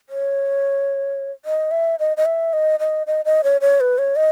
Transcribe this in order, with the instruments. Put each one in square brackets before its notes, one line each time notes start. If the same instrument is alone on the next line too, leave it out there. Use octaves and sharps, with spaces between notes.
[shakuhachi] C#5
D#5
E5
D#5
D#5
E5
D#5
D#5
D#5
D#5
C#5
C#5
B4
C#5
D#5